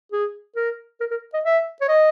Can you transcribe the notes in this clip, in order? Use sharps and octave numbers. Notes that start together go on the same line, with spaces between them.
G#4
A#4
A#4
A#4
D#5
E5
C#5
D#5